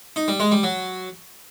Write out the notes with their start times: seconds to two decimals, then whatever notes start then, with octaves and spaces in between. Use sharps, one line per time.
0.16 D#4
0.28 G3
0.40 G#3
0.52 G3
0.63 F#3